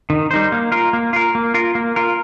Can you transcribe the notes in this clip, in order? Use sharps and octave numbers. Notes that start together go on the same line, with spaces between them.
D#3
G3 D#4 C5
A#3
F4 A#4
A#3
F4 A#4
A#3
F4 A#4
A#3
F4 A#4